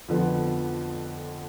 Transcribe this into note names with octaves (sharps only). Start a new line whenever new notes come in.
F2 D3 F3 B3